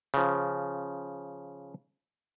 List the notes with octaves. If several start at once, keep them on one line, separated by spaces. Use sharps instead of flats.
C#3 F3